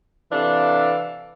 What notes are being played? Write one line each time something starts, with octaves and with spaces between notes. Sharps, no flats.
C3 E3 D4 A4 F5